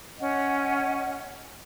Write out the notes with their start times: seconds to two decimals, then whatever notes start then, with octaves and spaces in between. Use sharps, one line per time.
0.19 C#4 D#5 F#5